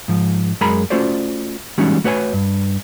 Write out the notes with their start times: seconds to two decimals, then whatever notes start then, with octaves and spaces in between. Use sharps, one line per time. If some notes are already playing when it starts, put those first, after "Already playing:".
0.08 G#2 F3
0.61 F#2 G#3 A#4 G#5 A#5 B5
0.90 A3 C#4 F4 F#4 C5 D5
1.78 E3 G3 G#3 C#4 D#4 F#4
2.04 A3 F#4 B4 C#5 D#5 G#5
2.33 G2